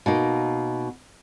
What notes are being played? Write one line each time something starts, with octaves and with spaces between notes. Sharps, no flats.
B2 A#3 D#4